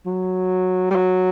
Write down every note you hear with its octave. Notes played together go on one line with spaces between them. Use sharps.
F#3
G3
F#3